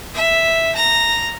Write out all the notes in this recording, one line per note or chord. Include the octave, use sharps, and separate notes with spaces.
E5
A#5